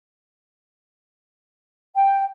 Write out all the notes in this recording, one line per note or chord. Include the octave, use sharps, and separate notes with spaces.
G5